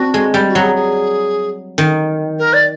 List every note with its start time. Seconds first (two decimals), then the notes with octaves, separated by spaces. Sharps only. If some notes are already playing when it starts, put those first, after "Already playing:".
Already playing: C4 D4 F#4
0.14 G#3
0.34 G3
0.48 F#4
0.55 F#3
0.61 G#4
0.76 G#4
1.78 D#3
2.39 A#4
2.54 D5